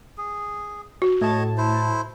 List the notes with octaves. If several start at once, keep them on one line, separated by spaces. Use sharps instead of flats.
G#4
F#4
A2 C#5 D#5 A5
E4 C5